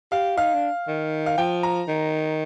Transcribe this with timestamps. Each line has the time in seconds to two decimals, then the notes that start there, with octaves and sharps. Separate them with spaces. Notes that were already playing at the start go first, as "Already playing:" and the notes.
0.12 G4 F5
0.37 D#4 F5
0.54 D4
0.88 D#3
1.26 F5
1.38 F3 G5
1.63 A#5
1.88 D#3